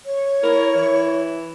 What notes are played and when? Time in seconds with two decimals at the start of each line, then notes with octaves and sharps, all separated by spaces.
0.05 C#5
0.43 E4 A#4
0.75 E3